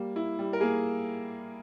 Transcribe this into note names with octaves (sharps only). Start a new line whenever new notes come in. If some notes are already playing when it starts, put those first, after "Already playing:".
Already playing: G3 A#3
E4
G3
A#4
A#3 G#4